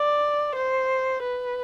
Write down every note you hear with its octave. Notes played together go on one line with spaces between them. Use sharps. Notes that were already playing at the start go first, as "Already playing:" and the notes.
Already playing: D5
C5
B4